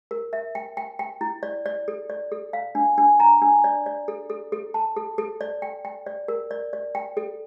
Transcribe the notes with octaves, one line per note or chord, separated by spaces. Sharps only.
A#4
E5
G5
G5
G5
E4
D5
D5
A4
D5
A4
F5
D4
D4
A#5
D4
D5
D5
A4
A4
A4
A5
A4
A4
D5
G5
G5
D5
A#4
D5
D5
G5
A4